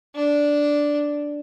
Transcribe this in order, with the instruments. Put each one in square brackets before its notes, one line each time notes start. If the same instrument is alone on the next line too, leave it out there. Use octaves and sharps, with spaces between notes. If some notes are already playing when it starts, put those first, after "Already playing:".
[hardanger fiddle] D4